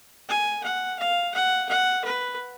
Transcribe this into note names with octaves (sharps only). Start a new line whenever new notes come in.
G#5
F#5
F5
F#5
F#5
B4